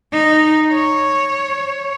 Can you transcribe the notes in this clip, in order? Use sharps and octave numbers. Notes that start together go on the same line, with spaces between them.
D#4
C#5